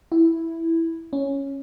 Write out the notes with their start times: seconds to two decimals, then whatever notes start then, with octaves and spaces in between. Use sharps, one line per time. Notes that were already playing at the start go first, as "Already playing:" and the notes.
0.12 E4
1.13 C#4